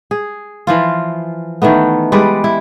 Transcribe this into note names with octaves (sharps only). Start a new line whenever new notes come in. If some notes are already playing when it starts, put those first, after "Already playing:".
G#4
E3 F3 F4
D#3 E3 A3 B3
G3 G#3 B4 D5
E4